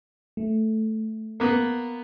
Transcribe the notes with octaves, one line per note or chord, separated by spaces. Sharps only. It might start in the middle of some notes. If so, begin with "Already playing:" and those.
A3
A#3 B3